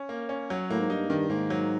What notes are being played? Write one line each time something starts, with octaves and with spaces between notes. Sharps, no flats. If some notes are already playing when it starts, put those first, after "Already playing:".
Already playing: C#4
A#3
C#4
F#3
A2 A#3
G#2
G2 D#4
G2 D#3
G#2 A#3
F#3